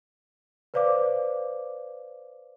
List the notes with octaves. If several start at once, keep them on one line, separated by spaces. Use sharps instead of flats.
B4 C5 D5 F5 D6